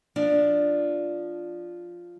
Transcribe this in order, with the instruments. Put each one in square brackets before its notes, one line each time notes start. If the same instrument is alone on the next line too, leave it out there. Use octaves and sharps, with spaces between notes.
[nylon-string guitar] F3 D4